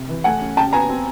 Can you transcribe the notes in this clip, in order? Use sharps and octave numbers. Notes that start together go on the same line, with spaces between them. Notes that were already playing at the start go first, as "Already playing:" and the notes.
Already playing: C3
E3
A3 F#5 G#5
C#4
C#3 G5 A5
B3 G#5 A#5
C4